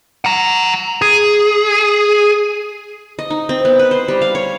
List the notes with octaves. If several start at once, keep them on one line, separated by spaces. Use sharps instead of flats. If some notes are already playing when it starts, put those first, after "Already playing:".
F#5 A#5
G#4
D#5
D#4
C4
B3
B4
C5
G3
F5
C#5